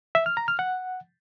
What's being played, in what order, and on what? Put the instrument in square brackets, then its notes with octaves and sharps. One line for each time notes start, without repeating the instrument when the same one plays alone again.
[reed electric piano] E5
F6
A#5
F6
F#5